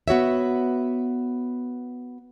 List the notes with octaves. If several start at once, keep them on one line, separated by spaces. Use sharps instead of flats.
B3 F#4 C#5 E5